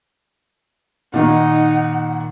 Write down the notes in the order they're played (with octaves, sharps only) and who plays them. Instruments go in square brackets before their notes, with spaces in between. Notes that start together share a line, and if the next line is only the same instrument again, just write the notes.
[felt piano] A#2 D#3 A#3 [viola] D#4 [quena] F#5